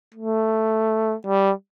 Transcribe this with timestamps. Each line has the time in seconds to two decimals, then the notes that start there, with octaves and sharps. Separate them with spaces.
0.14 A3
1.27 G3